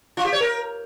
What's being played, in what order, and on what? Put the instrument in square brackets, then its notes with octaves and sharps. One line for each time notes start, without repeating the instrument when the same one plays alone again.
[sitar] F4
G4
C#5
A#4